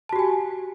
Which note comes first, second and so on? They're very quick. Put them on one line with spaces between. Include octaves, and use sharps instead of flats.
A5 F#4 G4 G#5